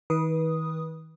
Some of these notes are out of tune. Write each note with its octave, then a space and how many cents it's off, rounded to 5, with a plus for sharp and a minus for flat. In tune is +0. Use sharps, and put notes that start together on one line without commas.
D#3 +40 B4 -25 D#6 +0